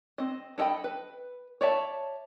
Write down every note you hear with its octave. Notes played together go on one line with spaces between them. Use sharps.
C4 D#5
D4 A4 D#5 G5 B5
B4
C#5 D5 E5 A5